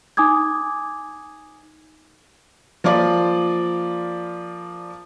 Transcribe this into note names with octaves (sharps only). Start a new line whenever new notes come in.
D#4 G#5 D6 D#6 G#6
F3 A#3 F4 D5